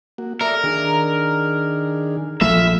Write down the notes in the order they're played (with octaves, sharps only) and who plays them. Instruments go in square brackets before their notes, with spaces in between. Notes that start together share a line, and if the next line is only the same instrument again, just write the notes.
[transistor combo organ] A#3 F#4
[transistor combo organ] A4 D5 E5 [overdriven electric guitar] A#4
[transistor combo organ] D#3 D4 G#4
[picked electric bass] A#1 F3 A3 [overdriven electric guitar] E5 [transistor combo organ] B5 F6